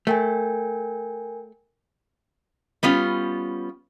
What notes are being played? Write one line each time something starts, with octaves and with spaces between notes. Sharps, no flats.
A3 A#4 G5 G#5
G3 B3 C#4 F4